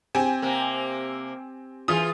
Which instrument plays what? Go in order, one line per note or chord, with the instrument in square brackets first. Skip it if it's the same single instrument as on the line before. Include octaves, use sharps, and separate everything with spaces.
[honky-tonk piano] C4 G4 G#5
[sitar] C3 A#3
[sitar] E3 F4 [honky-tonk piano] G#4 D#6